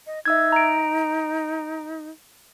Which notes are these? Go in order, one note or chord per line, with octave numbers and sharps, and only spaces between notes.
D#5
D#4 E5 E6 G#6
A#5 D7